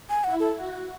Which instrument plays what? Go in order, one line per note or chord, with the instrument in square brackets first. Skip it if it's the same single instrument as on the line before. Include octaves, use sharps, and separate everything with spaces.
[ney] G#5
[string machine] E4 [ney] F#5
[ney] A4
[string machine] F#4